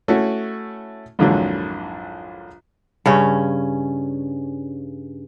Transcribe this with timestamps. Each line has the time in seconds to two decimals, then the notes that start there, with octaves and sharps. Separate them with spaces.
0.08 A3 C#4 E4 F#4
1.19 A#1 F2 G#2 D3 E3 F#3
3.06 G2 C#3 C#4